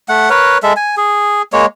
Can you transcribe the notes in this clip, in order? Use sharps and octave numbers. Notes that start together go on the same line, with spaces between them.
A3 F#5
A#4 B4 C#5
G#3 A4 E5
G#5
G#4
G#3 A#3 C#5